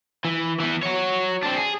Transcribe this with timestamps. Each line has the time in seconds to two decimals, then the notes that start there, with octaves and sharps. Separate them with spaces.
0.25 E3
0.60 E3 B3
0.83 F#4 C#5
1.42 C4 D4
1.56 G#4